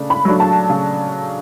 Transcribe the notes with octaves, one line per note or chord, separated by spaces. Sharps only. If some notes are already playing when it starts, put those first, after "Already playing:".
Already playing: C#3 A3 D4
B5
F#3 A3 D4
A5
C#3